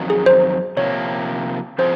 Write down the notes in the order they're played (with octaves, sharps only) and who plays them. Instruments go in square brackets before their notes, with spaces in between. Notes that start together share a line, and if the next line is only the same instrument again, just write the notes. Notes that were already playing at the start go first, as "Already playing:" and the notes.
Already playing: [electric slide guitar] F2 D#3 F#3
[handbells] G#4
C5
[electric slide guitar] C3 F3 A#3 [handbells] C#5
[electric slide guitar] F3 C4 F4 G#4 [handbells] C5